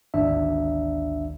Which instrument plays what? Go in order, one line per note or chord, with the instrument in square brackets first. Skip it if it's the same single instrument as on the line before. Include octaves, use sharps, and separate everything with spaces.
[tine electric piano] G#1 D2 D4 E5